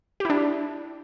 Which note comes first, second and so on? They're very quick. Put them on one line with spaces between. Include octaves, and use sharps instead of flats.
G4 E4 D4